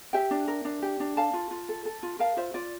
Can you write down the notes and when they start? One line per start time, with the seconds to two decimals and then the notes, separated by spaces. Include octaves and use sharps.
0.13 G4 E5 G5
0.31 D4
0.48 A#4
0.65 D4
0.82 G4
1.00 D4
1.17 A4 F5 A5
1.33 F4
1.51 F4
1.69 A4
1.85 A4
2.03 F4
2.19 A#4 F5 A5
2.37 F4 C5 E5
2.54 F4 D5